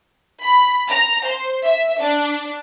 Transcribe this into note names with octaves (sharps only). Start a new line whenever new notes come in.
B5
A#5
C5
E5
D4